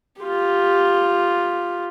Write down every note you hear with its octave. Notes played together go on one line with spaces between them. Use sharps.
F4 G4